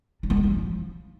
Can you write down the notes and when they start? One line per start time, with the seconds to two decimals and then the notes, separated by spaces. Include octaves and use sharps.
0.23 D4
0.30 B3
0.37 A3
0.44 G3
0.50 F3